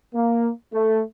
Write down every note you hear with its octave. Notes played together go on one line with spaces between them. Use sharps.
A#3
A3